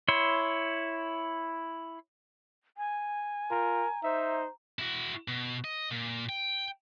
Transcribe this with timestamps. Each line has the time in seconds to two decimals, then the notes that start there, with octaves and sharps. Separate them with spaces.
0.08 E4 C#5 C6
2.77 G#5
3.51 F4 A#4 A#5
4.04 D#4 C5 E5
4.79 E4 F#4
5.28 B2
5.64 D#5
5.91 A#2
6.29 G5